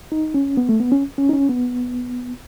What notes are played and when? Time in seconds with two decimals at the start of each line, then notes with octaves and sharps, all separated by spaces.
0.12 D#4
0.34 C#4
0.57 B3
0.69 A3
0.80 B3
0.92 C#4
1.18 C#4
1.29 D#4
1.33 C#4
1.49 B3